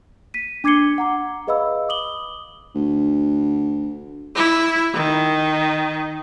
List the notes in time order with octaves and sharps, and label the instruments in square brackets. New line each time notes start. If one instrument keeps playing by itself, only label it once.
[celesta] B6 D#7
D4 D6 G#6 C7 C#7 G7
F#5 A#5 D6
G#4 B4 D#5 F5 B5 E6
D6 D#6 F#7 G7
[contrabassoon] D2
[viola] E4
D#3